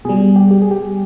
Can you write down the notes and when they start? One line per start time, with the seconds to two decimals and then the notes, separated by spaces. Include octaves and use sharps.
0.05 B2 G3 G#4
0.36 G4
0.51 G4
0.62 G#4
0.71 G4